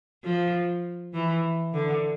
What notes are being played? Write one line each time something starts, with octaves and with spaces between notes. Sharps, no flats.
F3
E3
D3